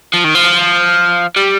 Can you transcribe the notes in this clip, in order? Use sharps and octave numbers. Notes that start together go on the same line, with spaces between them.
F3
D#3
F3
G3